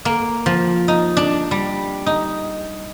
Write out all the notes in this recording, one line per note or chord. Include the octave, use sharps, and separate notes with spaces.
A#3
F3
D#4
D4
G3
D#4